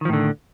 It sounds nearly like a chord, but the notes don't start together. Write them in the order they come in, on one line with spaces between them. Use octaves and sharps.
D#3 F3 A2 D3